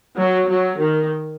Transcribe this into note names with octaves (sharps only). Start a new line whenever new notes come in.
F#3
F#3
D#3